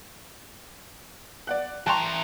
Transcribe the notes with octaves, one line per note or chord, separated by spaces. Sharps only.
D5 F#5 F#6
E3 G5 A5 A#5 C6 C#6 F#6